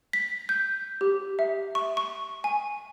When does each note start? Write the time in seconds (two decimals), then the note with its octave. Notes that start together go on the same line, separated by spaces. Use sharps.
0.13 B6
0.49 G6
1.01 G4
1.39 E5
1.75 C#6
1.97 C#6
2.44 G#5